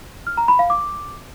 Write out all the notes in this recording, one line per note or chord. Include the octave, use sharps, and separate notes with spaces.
F6
A#5
B5
F5
D6